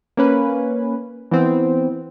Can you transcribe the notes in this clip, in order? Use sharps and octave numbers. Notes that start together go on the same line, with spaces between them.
A#3 C#4 B4
E3 B3 C4